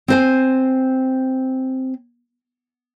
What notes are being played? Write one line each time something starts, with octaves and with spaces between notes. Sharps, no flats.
C4 C5 G#5